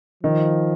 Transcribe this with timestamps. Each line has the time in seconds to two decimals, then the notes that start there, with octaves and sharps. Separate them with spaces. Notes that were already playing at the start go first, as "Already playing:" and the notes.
0.23 D#3 F3